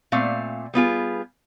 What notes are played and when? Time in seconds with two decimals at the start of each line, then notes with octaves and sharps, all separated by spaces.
0.12 A#2 A3 C4 F5
0.74 G3 B3 F4 G#4